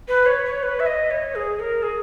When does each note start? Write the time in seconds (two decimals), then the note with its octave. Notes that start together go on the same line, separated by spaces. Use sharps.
0.08 B4
0.26 C#5
0.45 C#5
0.63 B4
0.80 E5
0.86 D#5
1.11 C#5
1.35 G#4
1.60 A#4
1.83 G#4